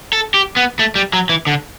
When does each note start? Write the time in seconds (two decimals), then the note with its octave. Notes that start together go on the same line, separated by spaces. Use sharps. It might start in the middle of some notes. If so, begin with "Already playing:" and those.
0.13 A4
0.34 G4
0.56 B3
0.79 A3
0.95 G3
1.13 F#3
1.29 E3
1.47 D3